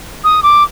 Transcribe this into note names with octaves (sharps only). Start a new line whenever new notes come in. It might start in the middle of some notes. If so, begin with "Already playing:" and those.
D#6
D6